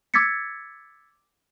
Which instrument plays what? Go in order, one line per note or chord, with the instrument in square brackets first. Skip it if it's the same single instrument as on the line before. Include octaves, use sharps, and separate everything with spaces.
[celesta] D6 E6 G#6 A6 B6 C#7